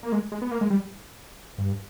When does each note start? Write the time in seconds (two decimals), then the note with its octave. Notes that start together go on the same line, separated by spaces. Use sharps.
0.03 A#3
0.12 G#3
0.32 G#3
0.42 B3
0.51 A#3
0.61 G#3
0.70 G3
1.58 G2